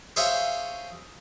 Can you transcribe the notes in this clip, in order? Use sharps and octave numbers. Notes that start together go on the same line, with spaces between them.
G#4 C5 C#5 E5 F5 G#5